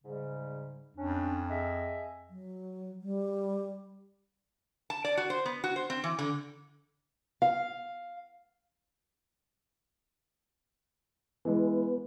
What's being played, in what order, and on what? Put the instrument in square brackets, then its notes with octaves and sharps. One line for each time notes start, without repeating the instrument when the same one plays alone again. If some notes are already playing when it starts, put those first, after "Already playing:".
[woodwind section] G#2 C#3 G3
[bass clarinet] F2 [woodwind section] C#4 D4
[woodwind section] G#4 D#5 E5
[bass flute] F#3
G3
[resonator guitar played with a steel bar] A5
D5
F#4
C5
B3
F#4
C5
C4
E3
D3
[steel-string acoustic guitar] F5
[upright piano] E3 G#3 [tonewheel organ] B3 B4